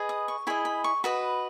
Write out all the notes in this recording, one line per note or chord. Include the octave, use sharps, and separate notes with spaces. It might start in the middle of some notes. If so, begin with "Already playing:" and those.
Already playing: G#4 B4 D#5
D#6
C#6
E4 G#4 D#5 B5
B5
C#6
F#4 B4 D#5 B5